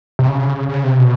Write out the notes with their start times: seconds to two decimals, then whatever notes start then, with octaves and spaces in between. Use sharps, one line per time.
0.19 C3
0.29 C#3
0.69 C#3
0.84 C3
0.99 B2